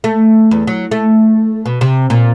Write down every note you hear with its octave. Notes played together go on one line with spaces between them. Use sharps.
A3
E2
F#3
A3
B2
C3
A#2